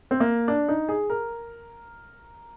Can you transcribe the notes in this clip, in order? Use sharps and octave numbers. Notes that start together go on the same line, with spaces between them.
C4
A#3
D4
D#4
G#4
A#4